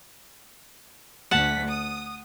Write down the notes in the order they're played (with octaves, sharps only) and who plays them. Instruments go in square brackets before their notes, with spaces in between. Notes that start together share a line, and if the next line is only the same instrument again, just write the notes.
[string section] D2 B6 [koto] F#5 A5
[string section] D#6